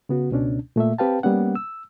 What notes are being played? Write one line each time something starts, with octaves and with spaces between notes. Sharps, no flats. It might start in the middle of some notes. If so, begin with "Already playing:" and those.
C#3 B3 F#4
C#2 B2 C#4 D4
A#2 A3 A#3 E5
C4 G4 B4 F5 G5 A5
G3 A#3 B3 C#4 F#5
E6